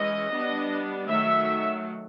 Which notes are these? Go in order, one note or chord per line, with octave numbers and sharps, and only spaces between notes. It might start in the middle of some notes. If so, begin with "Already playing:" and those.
Already playing: E3 G#3 C#4 D#5
G3 B3 D4
D#3 F#3 A3 E5